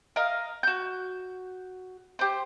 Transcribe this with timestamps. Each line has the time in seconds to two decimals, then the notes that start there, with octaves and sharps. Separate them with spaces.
0.16 A#4 D#5 F5
0.63 F#4 G6
2.19 G4 C5